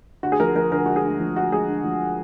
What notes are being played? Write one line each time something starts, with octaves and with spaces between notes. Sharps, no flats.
D2 F#4
G#4
F3 A#4
F3 A#4
D2 A#4
G#3 F#4
G#4
D2
F3
D2 F#4
G#3 G#4
D3
F3